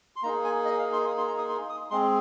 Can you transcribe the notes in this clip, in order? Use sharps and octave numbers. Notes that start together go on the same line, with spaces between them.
C6
A#3 D#4 G#4 A#5
G#5
D#5
F5
C6
D#6
C6
A#5
D#6
C6
D#6
G#3 C4 G#4 C6